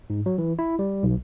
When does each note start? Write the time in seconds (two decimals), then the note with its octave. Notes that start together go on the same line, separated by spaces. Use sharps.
0.10 G#2
0.26 F#3
0.38 E3
0.59 E4
0.79 G3
1.03 B1